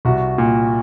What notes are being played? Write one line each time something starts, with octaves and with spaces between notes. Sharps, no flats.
C2 F#4
A#2